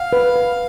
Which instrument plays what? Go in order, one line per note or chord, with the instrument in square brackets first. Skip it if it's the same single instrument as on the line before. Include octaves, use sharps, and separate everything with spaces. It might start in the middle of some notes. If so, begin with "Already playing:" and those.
Already playing: [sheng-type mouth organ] F5 [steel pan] F#5
[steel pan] B4
B4